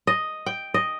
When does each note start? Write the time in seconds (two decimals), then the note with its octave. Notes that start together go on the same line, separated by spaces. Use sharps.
0.07 D#5
0.46 G5
0.74 D#5